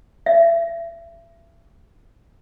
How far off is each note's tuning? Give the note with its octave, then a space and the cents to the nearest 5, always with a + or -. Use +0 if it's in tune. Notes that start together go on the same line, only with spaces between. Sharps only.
E5 +35